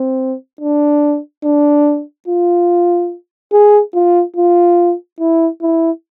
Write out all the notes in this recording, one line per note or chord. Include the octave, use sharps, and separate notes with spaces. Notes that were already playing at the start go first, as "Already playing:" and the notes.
Already playing: C4
D4
D4
F4
G#4
F4
F4
E4
E4